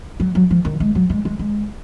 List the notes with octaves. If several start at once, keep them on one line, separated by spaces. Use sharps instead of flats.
F#3
F#3
F3
D#3
G#3
F#3
G#3
G#3
G#3